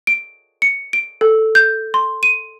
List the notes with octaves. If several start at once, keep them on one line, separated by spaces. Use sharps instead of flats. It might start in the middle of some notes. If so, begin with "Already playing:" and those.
D7
C#7
D7
A4
G6
C6
D#7